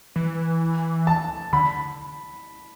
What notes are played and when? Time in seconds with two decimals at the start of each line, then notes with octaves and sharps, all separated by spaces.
0.16 E3
1.07 A5
1.52 D3 B5